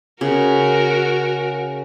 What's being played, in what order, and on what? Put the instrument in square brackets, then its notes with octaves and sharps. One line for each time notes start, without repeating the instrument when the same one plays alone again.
[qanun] C#3 [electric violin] F#4 A#4